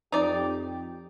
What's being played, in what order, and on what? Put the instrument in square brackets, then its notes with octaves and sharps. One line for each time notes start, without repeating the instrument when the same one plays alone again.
[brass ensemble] F2 G4 [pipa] D#4 D5